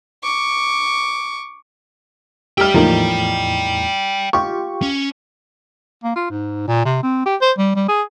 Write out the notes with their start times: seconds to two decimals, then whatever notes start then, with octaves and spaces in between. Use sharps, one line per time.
0.23 C#6 D6
2.58 G4 D5 E5 G5 F6
2.74 E2 A2 F3 A#3 D#4
4.33 F4 G4 C#6
4.82 C#4
6.04 A#3
6.16 F4
6.30 G#2
6.67 A#2
6.85 C3
7.03 C4
7.25 G4
7.41 C5
7.58 G3
7.75 G3
7.88 G#4